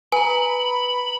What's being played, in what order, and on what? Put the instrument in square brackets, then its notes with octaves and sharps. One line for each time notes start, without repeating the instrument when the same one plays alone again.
[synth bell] B4 A#5 [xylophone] G#5 [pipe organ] B5